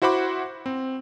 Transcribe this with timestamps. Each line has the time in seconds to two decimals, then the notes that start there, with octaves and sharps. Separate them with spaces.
0.02 E4 F#4 C5 F#5 B5 D6
0.66 C4